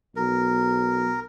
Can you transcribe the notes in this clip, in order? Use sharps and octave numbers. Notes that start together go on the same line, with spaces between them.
B1 A#4